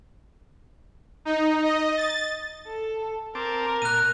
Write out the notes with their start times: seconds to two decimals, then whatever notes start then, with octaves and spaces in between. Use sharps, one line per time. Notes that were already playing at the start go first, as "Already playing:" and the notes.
1.25 D#4
1.63 D#5
1.97 A6
2.67 A4
3.35 C4 A#4 A5 D6
3.82 A#2 F#6 D#7